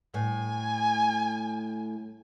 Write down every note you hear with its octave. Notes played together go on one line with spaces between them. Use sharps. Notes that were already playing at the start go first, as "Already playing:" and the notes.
A2 G#5